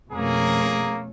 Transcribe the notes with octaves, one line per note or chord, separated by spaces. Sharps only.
F2 B2 A3 A#3 C#4 G#4 A#4